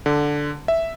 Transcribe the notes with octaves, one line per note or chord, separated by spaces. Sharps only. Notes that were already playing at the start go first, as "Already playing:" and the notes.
D3
E5